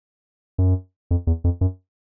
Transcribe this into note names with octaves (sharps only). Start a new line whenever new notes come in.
F#2
F2
E2
F2
F#2